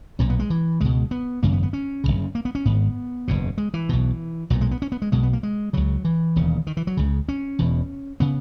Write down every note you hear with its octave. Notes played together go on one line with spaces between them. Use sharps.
B1 A#2 C#4
B3
G#3
E3
C#2 B2 G#3
B3
G#1 F#2 C#3 A#3
B3
B3
C#4
F#1 E2 C#3
A#3
B3
C#4
G#1 G#2 B3
F#1 E2 B2
G#3
E3
B1 B2
B1 A#2 F#3
G#3
B3
C#4
B3
G#3
B1 B2 G#3
B3
A#3
G#3
C#2 C#3 F#3
E3
E1 D#2 C#3
D#3
E3
F#3
C#2 C#3
C#4
E1 E2 B2
C#3 B3